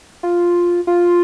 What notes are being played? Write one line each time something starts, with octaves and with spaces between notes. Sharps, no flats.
F4
F4